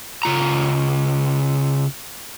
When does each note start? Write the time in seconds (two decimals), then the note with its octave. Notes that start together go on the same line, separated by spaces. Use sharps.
0.23 C#3 F4 A#5